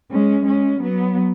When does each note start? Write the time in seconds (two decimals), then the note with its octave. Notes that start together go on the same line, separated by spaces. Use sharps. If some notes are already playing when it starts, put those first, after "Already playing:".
0.11 G#3 C#4
0.46 G#3 C#4
0.81 F#3 B3